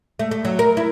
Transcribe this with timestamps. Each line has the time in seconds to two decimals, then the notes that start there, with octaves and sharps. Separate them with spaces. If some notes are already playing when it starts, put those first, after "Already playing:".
0.19 A3
0.31 A3
0.45 F#3
0.59 A#4
0.77 E4